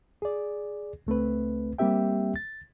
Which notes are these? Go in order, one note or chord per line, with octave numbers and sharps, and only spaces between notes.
G#4 D5
C#2 A3 C4 B4
G3 A#3 C4 G4 E5 G5
A6